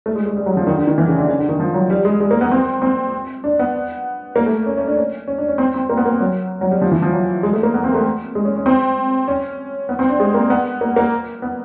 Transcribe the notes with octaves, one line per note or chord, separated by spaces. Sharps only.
A3
G#3
G#3
G3
F#3
F3
D#3
D3
D#3
E3
C#3
D3
C#3
D3
D#3
F3
F#3
G3
G#3
G#3
A#3
B3
C4
C4
D4
B3
A#3
A3
C#4
C#4
D4
C#4
C#4
D4
C#4
C4
C4
A#3
B3
A#3
F#3
F#3
G3
F3
E3
F3
F#3
G#3
A3
A#3
B3
C4
A3
G#3
C#4
C#4
C4
C#4
B3
C4
D4
G#3
A#3
B3
A#3
A#3
B3